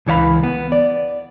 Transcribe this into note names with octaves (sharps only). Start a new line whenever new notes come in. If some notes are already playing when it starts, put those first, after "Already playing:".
C#2 E3 C#5 F5 B5
B3
D5